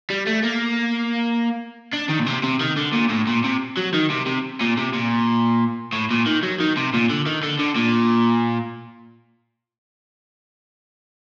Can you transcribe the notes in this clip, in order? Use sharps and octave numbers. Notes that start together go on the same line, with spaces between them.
G3
A3
A#3
D4
D#3
A#2
C3
C3
D#3
D3
A#2
A2
A#2
C3
F#3
D#3
C3
C3
A#2
C3
A#2
A2
A#2
D#3
F#3
D#3
C3
A#2
D3
D#3
D3
D3
A#2